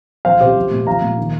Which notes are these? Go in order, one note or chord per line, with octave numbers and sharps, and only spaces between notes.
F3 C5 F5
C3 G4 C5
F3
A#2
F3 F5 A#5
A#2
D#3